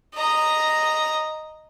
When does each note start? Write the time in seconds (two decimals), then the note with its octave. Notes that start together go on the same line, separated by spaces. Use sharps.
0.14 D#5 A#5